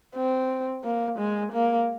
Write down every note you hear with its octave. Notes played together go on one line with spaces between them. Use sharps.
C4
A#3
G#3
A#3